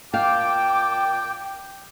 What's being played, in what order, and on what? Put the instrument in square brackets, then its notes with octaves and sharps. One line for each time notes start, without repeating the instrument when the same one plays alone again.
[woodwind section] A#2 A5 D6 [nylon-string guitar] F5 [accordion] G5